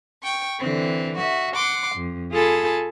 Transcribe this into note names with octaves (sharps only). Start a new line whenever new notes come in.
G5 C#6
D3 E3 C4
F#4 E5
F#5 C6 D6
F2
F4 G#4 A4 G#5 A5 B5